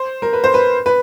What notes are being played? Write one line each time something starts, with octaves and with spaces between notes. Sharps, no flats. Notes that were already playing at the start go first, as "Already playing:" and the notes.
Already playing: C5
A#4
B4
C5
B4
B4